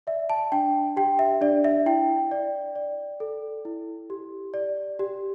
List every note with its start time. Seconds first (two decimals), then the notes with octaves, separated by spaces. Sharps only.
0.07 D5 E5
0.30 A5
0.52 D4 G5
0.97 G4 G5
1.19 E5
1.41 D4 D5
1.64 E5
1.86 E4 G5
2.31 D5
2.76 D5
3.20 A4
3.65 E4
4.10 G4
4.54 D5
4.99 G4